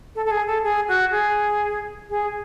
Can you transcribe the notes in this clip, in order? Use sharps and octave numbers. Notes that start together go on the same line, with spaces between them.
A4
A4
G#4
A4
G#4
F#4
G#4
G#4